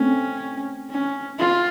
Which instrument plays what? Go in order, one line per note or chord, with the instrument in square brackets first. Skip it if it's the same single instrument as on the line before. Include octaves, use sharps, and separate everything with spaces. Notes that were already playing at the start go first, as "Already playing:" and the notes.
Already playing: [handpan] A3 C4 [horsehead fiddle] C#4
[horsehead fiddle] C#4
F4